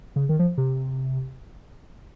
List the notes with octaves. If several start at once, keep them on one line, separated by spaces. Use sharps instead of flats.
C#3
D#3
F3
C3